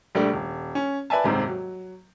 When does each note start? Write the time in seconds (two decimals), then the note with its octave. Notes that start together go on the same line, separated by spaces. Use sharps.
0.15 A#1 G3 A3 D4
0.34 D#1
0.75 C#4
1.10 B4 D5 E5 G#5 A5
1.24 D#1 G#2 C3 C5
1.48 F#3